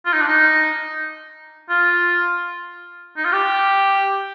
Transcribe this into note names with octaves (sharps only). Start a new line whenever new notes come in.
F4
D#4
D4
D#4
F4
D#4
F4
G4